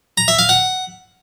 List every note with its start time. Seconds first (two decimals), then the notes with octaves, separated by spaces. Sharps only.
0.17 A#5
0.28 E5
0.39 F5
0.49 F#5